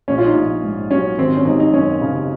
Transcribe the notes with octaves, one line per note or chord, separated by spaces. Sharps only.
A#1 C#4
F4
D#4
A#1
G#2
F#3 C#4
G#1 C4
C#4
G#1 D#4
D#4
F#2 C#4
C#3